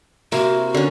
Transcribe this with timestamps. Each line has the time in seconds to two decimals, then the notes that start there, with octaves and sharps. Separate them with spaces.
0.32 C3 A#3 E4 F#4
0.74 D3 C#4